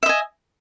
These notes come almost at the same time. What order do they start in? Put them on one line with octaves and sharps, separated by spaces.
E5 D#5 G#5